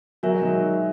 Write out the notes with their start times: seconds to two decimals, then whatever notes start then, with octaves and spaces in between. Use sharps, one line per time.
0.23 F#3 F#4 A#4 E5 G#5
0.33 G#3
0.42 D#3 F#3